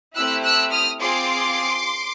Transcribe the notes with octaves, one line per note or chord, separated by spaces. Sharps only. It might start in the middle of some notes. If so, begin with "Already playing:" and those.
A3 C4 E4 G4 E6 F#6
E6 F#6
D#6 F6
C4 F4 G#4 C6 D6